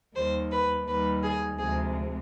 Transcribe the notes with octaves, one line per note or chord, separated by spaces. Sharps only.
D#2 D#3 G3 C5
B4
D#2 D#3 G3 B4
G#4
D2 C3 F3 G#3 G#4